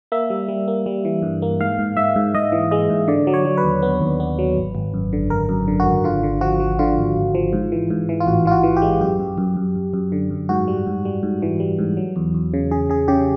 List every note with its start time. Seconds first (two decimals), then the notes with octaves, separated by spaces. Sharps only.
0.12 A#3 E5
0.30 G3
0.48 G3
0.68 A#3
0.86 G3
1.05 E3
1.23 G2
1.42 A#3
1.60 G#2 F5
1.78 G#2
1.97 G#2 E5
2.16 G#2
2.35 G#2 D#5
2.52 E3
2.71 G#3 D#5
2.90 G#2
3.08 D3 D5
3.27 F#3
3.34 C#5
3.45 F#3
3.57 B4
3.64 D#2
3.82 B3
4.01 D#2
4.20 B3
4.39 F#3
4.57 G#1
4.75 G#1
4.94 F#2
5.13 D3
5.30 G#1 A#4
5.49 F#2
5.68 D3
5.80 F#4
5.86 G#1
6.04 D3 F4
6.23 D3
6.41 F3 F#4
6.60 F3
6.79 D3 F4
6.98 G#1
7.16 G#1
7.35 F3
7.53 G#2
7.72 E3
7.90 G#2
8.09 E3
8.20 F4
8.27 A1 F#4
8.45 E3 F4
8.51 F#4
8.63 E3
8.77 G4
8.82 G#3
9.00 F#2 G4
9.20 F#2
9.38 F#2
9.56 F#2
9.75 F#2
9.94 F#2
10.12 D3
10.31 F#2
10.49 G#2 F#4
10.68 G3
10.87 G#2
11.05 G3
11.23 G#2
11.42 E3
11.60 G3
11.79 G#2
11.97 F#3
12.16 E2
12.34 E2
12.54 C#3
12.71 C#3 G#4
12.89 C#3 G#4
13.08 C#3 G4